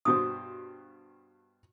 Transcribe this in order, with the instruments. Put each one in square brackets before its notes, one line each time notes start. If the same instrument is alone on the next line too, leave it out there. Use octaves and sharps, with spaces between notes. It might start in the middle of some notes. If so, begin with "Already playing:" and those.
[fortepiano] G2 B2 C5 [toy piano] F#4 D#6